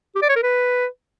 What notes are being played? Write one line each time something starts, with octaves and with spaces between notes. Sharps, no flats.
G4
D5
C#5
A#4
B4